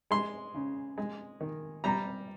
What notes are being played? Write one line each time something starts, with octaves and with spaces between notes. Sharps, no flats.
G#3 C6
C#3
G#3
D#3
G3 A#5